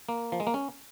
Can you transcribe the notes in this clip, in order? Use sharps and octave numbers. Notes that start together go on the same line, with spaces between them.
A#3
F3
G#3
A#3
C#4